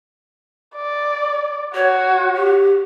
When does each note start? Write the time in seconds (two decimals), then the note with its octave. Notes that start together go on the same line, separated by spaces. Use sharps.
0.76 D5
1.75 F#4 C#5
2.36 G4